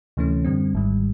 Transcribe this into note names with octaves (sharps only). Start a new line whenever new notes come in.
D2 C3 E3 A3 C#4
F#2 D3 G3 C4
G#1 G#2 D#3 G3